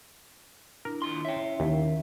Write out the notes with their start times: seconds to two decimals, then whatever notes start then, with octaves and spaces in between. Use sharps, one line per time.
0.85 D4 E4 A#4
1.02 D#2 F4 C6
1.25 C#4 E4 C#5 E5 G5
1.60 D#2 D#3